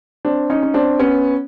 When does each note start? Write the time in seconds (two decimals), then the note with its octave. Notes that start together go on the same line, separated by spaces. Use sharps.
0.25 C4 D4
0.50 C#4 D#4
0.62 C#4
0.74 C4 D4
0.99 B3 C#4